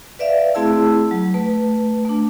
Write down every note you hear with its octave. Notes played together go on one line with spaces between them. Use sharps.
B4 D5 E5 F5
A3 C4 E4 G#4 A5 E6
F#3
A3 B4
A3 D4